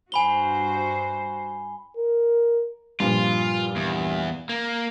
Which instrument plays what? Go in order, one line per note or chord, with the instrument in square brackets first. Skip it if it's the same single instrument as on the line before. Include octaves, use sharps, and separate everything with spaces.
[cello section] G2 F#4 C5 [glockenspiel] G#5 B5 G7
[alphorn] A#4
[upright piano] G2 A#2 F3 [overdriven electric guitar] F4
[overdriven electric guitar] E2
A#3